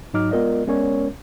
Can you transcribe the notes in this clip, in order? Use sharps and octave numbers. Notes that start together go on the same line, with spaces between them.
G#2 F#3 D#4 D6 F6
G#3 B3 F4 A#4 D5 D#5
G#3 B3 C#4 A#4 C#5 D5